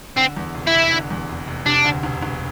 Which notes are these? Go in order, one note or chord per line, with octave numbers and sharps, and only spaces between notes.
D3 C4
E2
F1
E4
F1
D3
E2
F1
F1
C3 D4
D2
E1
E1